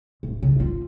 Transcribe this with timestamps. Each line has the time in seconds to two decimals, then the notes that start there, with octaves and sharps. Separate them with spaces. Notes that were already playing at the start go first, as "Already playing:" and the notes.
0.23 D1
0.43 C#3
0.60 F4